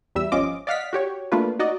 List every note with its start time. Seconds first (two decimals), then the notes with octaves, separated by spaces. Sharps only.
0.15 E2 G3 E5 E6
0.32 G#1 F3 C#4 F4 D#5 D6
0.67 D5 D#5 F5 F#5 F6 B6
0.93 F#4 G4 C#5
1.32 A3 A#3 D4 F4 B4
1.59 D#4 F#4 D5 D#5